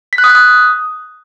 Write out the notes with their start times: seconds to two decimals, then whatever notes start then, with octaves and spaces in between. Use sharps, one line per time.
0.13 B6
0.18 F#6
0.24 D#6
0.29 F#6
0.35 D#6